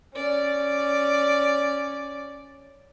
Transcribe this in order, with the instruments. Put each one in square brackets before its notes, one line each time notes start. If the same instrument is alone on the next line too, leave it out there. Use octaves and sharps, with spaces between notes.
[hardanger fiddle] C#4 D5